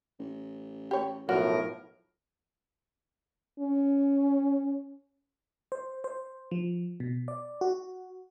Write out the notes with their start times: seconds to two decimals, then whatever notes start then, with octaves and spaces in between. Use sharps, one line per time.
0.19 A1
0.91 G4 C#5
1.29 B1 A2 F3 F#4 A#4 C#5
3.59 C#4
5.72 C5
6.04 C5
6.51 F3
7.00 B2
7.28 D5
7.61 F#4